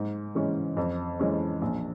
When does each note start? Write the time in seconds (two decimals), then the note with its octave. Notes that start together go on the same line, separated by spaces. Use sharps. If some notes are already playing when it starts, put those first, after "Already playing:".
Already playing: G#2
0.35 E3 G#3 C#4
0.77 F2
1.19 E3 G#3 C#4
1.62 A#1